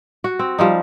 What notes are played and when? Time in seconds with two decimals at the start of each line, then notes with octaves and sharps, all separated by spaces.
0.24 F#4
0.39 C4
0.58 F3 G3 D#4